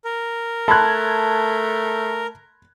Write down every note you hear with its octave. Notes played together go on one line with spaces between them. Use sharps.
A#4
A3 A5 B5 C6 F#6 G#6